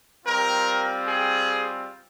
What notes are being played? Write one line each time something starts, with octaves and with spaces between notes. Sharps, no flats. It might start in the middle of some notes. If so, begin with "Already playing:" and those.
G3 C4 F4 A#4
G#4